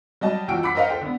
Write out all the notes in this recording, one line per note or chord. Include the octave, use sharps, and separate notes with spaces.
F#3 G3 D#5 A5
E2 F3 F#4 G5 E6 D7
F#5 B5 D6 B6
A#4 C5 D#5 F5 F#5
A4 C5 G5
D3 B3